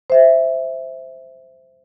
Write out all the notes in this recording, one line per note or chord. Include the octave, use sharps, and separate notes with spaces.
C5 E5